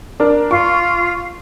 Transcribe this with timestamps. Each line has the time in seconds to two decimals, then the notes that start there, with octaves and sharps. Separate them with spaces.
0.20 D4 A#4
0.51 F4 C#6